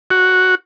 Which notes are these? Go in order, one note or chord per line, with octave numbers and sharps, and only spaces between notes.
F#4